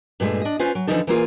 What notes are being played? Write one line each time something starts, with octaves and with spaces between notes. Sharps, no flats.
G2 A#2 G#3 A3
D4 D#5
C#4 F4 B4 C5
F#3
D3 E3 F3 A3 D#4 A4
E3 A#3 F4 G#4